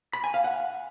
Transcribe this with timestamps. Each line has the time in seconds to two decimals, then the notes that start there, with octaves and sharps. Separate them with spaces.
0.13 B5
0.24 G#5
0.34 F5
0.44 F#5